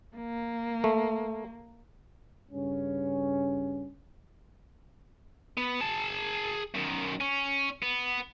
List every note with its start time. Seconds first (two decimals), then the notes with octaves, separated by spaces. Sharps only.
0.16 A#3
0.84 A3
2.51 G2 C#3 C#4
5.57 B3
5.80 G#4 A5
6.74 F#2 D#3
7.21 C#4
7.82 B3